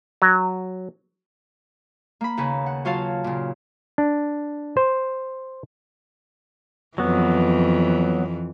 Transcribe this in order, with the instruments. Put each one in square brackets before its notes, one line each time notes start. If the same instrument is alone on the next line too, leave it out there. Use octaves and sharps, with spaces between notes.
[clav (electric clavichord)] F#3
[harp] A#3 B5
D#2 C#3 B4
F#5
F#3 F4 C#5 F5 A5
A#2 C#3
[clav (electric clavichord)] D4
C5
[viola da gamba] F2 E3 [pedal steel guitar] F#3 B3